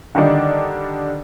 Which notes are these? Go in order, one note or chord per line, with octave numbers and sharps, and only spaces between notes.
D3 D#3 G3 D4 D#4